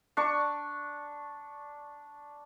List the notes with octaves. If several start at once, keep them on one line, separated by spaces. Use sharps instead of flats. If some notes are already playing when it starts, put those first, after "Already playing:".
D4 C#6